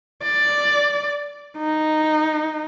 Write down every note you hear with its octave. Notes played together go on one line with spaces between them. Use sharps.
D5
D#4